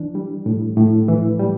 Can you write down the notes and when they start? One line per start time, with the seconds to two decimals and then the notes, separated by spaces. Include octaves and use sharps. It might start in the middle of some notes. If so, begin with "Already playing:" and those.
Already playing: E3 D4
0.15 G3
0.46 A2
0.77 A2
1.09 E3
1.40 G3